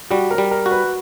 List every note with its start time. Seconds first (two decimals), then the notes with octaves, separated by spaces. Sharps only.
0.10 G3 F#4
0.31 A#4
0.38 G3
0.51 A#4
0.66 F#4
0.71 B4